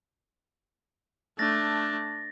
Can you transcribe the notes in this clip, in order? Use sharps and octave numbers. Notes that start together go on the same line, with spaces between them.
A3 D4 A6 A#6